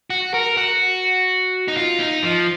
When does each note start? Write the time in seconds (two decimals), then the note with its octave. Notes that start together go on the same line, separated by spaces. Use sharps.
0.10 F#4
0.34 A#4
0.57 F#4
1.68 D#4
1.76 F4
1.99 D#4
2.23 F3